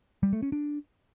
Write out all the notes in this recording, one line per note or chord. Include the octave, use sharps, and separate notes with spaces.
G3
A3
C#4
D4